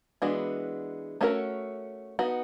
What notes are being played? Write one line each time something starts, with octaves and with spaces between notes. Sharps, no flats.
E3 G#3 B3 D4 F#4
A3 C#4 F#4 A#4
B3 D#4 F#4